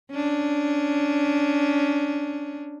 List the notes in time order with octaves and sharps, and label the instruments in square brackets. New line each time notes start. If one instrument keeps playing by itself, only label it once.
[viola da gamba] C#4 D4